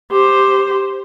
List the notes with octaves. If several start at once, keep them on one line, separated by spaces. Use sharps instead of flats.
G4 C5